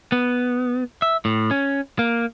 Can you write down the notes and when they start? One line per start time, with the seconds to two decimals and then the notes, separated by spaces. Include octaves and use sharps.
0.12 B3
1.02 E5
1.25 A2
1.51 C#4
1.99 A#3